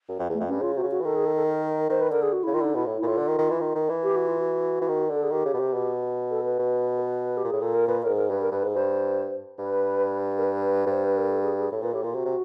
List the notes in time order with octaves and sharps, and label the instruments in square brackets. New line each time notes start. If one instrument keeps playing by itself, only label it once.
[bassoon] F#2
F2
[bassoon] E2 [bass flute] A3
[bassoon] F2
[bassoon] G2 [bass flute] C#4
[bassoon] C#3 [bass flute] F4
[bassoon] C3 [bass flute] F#4
[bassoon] C#3
[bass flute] F#4
[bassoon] E3
[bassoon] D#3 [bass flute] A4
[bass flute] G#4
A4
A4
A#4
[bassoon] D#3 [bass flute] C5
[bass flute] B4
[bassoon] D3 [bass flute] A#4
[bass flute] G#4
F#4
E4
[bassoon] C#3
[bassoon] D#3 [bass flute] F4
[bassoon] D3 [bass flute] D#4 E4
[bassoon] B2 [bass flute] E4
[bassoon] A2
[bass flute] E4
[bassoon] A#2
[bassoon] A2 [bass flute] F4
[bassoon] D3
D#3
D#3
E3
D#3
D#3
E3
[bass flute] G4
F#4
F4
F#4
[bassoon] E3
D#3
[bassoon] D3 [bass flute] A4
[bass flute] G#4
[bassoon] D#3 [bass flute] G4
[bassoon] C#3
B2
C3
B2
[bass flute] A4
B4
[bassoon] B2
[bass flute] A#4
B4
G4
[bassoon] A#2
[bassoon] A2 [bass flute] G#4
[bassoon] A#2 [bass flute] A4
[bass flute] A#4
[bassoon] A#2 [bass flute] B4
[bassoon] A2 [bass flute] A#4
[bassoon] G#2
[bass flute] A#4
[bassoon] G2 [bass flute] B4
[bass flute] A#4
[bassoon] G2 [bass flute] B4
[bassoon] G#2
[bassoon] G2 [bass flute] C5
[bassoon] G2 [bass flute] B4
[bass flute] A#4
B4
[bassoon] G2 [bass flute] C5
[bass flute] B4
A#4
A4
G#4
G#4
[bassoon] A2 [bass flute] A4
[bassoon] A#2 [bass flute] B4
[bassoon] A2 [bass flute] G4
[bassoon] A#2 [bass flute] F4
[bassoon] C3 [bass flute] F#4
[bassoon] C3